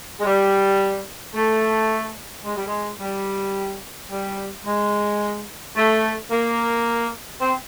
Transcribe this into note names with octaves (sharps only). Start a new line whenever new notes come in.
G#3
G3
A3
G#3
G3
G#3
G3
G3
G#3
A3
A#3
C4